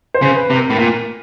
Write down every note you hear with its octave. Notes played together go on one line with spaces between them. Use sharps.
C5
C#3
B4
C3
A#4
A2
A#2